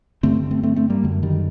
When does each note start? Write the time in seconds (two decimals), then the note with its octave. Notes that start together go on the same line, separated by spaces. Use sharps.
0.23 G2 D3 A3 C4
0.51 A3 C4
0.63 A3 C4
0.76 A3 C4
0.90 G3 A#3
1.04 F#2 D3
1.23 D#3 G3